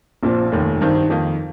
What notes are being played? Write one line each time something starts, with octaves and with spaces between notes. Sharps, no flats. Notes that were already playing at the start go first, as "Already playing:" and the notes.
A#1 A#2 F3 C4
F1 D#2 D#3
G2 D#3 C4 D#4
F2 D#3 A#3 D#4